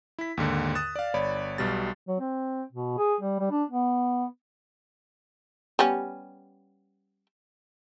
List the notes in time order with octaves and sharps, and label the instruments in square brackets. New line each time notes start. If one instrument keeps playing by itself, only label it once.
[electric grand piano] E4 B6
D#2 G#2 D3
D#6 F#6 A6 E7
D5 F5
G1 C#5 D5 B5
B1 B2 G3 A6
[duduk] F#3
C4
B2
G#4
G3
G3
D4
B3
[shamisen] G3 B3 C#4